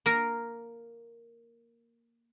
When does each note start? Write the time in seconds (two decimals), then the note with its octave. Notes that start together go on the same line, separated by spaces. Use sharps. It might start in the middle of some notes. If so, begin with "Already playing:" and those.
0.06 A#3 A#4